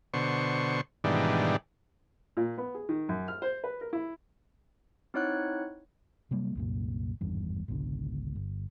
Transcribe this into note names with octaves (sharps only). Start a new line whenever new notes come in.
B2 D3 C5 C#6
G#2 B2 D#3 E3 G3 D4
A#2
B3
G#4
D#3
F#2
F6
C5
B4
A#4
E4
C4 D#4 E4 C#5 F#5 F#6
C3 F#3 G3 A#3
C2 F#2 A#2
G#1 E2 G2
G#1 C#2 B2 D3
G1